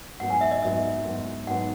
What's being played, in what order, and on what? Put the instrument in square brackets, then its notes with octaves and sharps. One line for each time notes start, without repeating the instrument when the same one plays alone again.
[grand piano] G#2 F#3 B3 [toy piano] F#5
[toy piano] G#5
E5
D#5
[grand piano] G#2 F#3 B3 [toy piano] E5
[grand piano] G#2 F#3 B3
[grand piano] G#2 F#3 B3 [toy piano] F#5